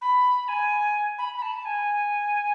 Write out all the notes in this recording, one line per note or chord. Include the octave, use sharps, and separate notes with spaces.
B5
G#5
B5
B5
A5
G#5